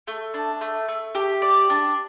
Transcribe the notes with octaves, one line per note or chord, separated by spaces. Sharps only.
A3
D4
A3
A3
G4
D5
D4